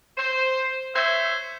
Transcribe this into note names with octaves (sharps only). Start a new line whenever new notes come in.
C5
C5 C#5 E5